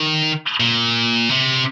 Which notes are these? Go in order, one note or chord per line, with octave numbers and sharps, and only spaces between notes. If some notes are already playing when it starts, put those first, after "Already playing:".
Already playing: D#3
A#2
C3